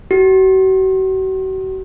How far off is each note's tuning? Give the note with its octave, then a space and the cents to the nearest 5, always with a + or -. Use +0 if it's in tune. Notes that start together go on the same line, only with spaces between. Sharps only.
F#4 +40